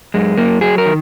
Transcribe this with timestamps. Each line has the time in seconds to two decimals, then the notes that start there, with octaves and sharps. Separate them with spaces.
0.14 F#2 G#3
0.37 F#2 A#3
0.61 F#3 G#4
0.78 A#4
0.86 D#3